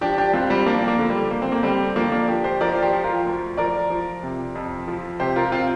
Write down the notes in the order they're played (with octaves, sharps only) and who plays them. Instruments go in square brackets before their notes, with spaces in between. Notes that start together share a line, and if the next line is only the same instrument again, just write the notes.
[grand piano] F3 D4 G4
D4 G4
C2 C4 F4
G3 C4
F3 A#3 D4
A#3
D3
G3
D3 A#3
C4
A#3
D3 G3 C4
F3 A#3 D4
A#3 D4
F3 D4 G4
G4 C5
F3 A#4 D5
G4 C5
F3
F4 A#4
D2
F3 A#4 D5
F3
C3
F2
F3
C3 G4 C5
F4 A#4
C4 F4